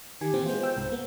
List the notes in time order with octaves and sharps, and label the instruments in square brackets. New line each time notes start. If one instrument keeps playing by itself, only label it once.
[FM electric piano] D#3 G#5 [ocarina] G4
[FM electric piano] A#2 E3 C4
[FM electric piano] G#3 B3 F4 [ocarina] C5
[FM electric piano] G5 E6
C2 G#2
A#3 B3